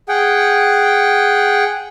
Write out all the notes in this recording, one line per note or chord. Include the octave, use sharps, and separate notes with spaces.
G#4 F#5 G5